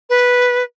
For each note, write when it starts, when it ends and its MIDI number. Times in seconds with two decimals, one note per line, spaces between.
0.10 0.63 71